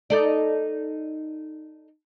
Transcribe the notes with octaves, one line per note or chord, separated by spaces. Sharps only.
D#4 A4 D5